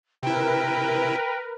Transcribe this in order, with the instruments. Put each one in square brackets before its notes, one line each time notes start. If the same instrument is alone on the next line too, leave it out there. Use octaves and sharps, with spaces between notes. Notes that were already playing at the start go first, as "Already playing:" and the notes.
[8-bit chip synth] C3 E4 [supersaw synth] A#4 B4 [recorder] G5